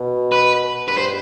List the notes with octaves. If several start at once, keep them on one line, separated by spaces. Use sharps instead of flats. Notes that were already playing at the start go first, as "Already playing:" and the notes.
Already playing: B2
B4
G2 B4
C5